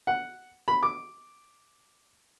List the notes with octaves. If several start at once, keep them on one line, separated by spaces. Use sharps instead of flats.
F#5
B5
D6